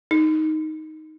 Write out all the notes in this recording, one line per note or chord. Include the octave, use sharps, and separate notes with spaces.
D#4